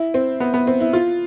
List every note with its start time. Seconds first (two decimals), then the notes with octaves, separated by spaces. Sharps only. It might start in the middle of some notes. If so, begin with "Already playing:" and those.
Already playing: E4
0.14 C4
0.40 B3
0.54 B3
0.67 C4
0.80 E4
0.93 F4